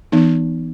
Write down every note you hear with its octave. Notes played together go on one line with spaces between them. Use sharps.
E3 B3 D#4